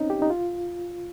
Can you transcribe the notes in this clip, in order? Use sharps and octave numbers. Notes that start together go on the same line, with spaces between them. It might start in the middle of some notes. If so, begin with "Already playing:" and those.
Already playing: C4 C#4 D#4
G4
D#4
F4